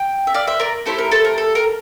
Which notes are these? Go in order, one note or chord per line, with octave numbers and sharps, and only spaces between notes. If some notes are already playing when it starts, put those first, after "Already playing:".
Already playing: G5
E5
D5 F5
C5 E5
A#4 D5
A3 E4 G4 A4 C5
A#4
A4 C5
A#4
A4
A#4